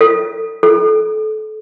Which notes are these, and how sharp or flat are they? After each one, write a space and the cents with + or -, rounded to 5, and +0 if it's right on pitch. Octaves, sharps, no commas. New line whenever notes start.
A4 +25
A4 -30